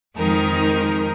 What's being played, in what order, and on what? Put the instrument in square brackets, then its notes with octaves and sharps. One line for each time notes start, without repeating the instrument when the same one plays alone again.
[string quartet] F2 D#3 G#3 D#4 A#4